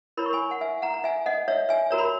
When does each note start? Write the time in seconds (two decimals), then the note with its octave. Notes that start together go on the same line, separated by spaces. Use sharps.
0.17 E4 A#4 C#5 B5
0.26 C#6
0.33 G#5 B5
0.51 F#5
0.61 E5 G#5
0.82 F#5 A#5
0.94 A#5
1.04 E5 G#5
1.26 D#5 F#5
1.48 C#5 E5
1.69 E5 G#5
1.91 F#4 A#4 C#5 A#5
1.98 B5